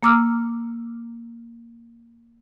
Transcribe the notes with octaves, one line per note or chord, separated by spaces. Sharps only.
A#3 A#5 D6 E6 F6